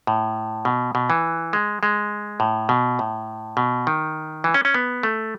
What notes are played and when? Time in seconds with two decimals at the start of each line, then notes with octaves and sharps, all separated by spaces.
0.07 A2
0.65 B2
0.95 B2
1.10 E3
1.53 G#3
1.83 G#3
2.40 A2
2.69 B2
2.99 A2
3.57 B2
3.87 D#3
4.44 E3
4.54 C#4
4.65 C#4
4.74 B3
5.03 A3